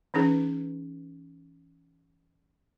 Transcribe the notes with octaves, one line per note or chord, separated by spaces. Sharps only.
E3 C#4 D#4 G#4 B4